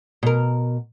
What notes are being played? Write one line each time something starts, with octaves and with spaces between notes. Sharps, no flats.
B2 A#4